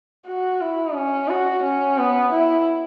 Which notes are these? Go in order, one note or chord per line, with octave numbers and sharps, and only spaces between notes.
F#4
E4
C#4
F#4
C#4
B3
E4